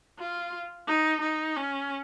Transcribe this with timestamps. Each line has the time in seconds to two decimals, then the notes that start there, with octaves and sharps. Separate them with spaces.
0.19 F4
0.87 D#4
1.21 D#4
1.56 C#4